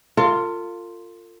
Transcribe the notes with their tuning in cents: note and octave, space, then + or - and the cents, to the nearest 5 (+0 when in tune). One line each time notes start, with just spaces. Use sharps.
F4 +0 A4 +45